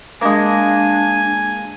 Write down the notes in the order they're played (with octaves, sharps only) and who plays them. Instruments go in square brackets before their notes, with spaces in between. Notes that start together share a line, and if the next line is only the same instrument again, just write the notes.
[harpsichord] G#3 A#3 [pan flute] D4 [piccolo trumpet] G#5